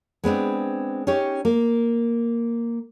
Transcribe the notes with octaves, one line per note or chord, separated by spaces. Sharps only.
G#3 B3 C4 D4
C#4 D#4 G4 C#5
A#3